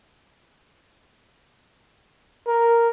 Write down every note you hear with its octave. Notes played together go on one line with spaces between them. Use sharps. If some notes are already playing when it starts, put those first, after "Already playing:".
A#4